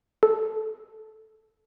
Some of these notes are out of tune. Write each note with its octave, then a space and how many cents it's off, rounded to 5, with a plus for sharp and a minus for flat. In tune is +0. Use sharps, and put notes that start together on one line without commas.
A4 -5